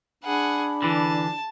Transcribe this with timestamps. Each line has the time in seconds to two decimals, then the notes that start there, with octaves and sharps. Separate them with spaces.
0.24 D4 G#4 F#5 B5
0.82 D3 E3 A5